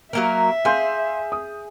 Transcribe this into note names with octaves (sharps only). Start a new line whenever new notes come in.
F#3 A#3 A#4 E5
G#4 F5 C6 G6
D#6